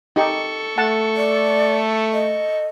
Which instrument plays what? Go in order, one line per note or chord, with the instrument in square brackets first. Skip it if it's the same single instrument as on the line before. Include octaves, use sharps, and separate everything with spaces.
[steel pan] D#4 G4 [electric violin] A4 C#6
[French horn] A3 [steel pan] F#5 A5
[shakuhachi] D5
D#5